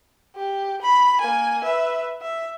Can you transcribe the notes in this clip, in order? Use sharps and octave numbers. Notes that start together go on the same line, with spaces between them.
G4
B5
A#3 G#5
B4 E5
E5